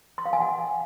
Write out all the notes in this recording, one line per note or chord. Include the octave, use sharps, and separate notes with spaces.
C6
F5
G#5
F#5